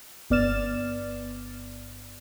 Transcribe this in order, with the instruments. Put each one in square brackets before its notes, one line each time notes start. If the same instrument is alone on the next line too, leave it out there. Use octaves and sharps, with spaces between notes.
[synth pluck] G1 B3 D5 F6 A6 E7